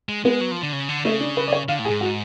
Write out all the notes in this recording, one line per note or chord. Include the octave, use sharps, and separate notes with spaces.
G#3
G#3 B3
F#3
F3
D3
C#3
D3
C#3 A3
D4
B4
D5
C#5
D3 F5
A2
G#4
G#2
F#4